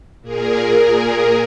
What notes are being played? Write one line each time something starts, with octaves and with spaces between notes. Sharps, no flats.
A#2 G#4 A#4